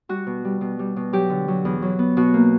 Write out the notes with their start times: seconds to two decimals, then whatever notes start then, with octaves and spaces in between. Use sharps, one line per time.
0.09 G3 F#4
0.27 B2
0.45 G3
0.61 B2
0.79 G3
0.96 B2
1.13 F#3 G4
1.30 D3
1.48 F#3
1.65 E2
1.82 F#3
1.99 B3
2.17 B2 F#4
2.34 A#3